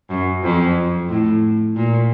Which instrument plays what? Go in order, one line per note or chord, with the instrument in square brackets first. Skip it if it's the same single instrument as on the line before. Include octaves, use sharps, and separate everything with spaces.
[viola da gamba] F#2
F2
A2
A#2